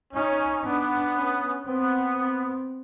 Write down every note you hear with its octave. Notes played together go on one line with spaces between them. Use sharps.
C#4 D#4
B3 D4
C#4
B3 C4
C4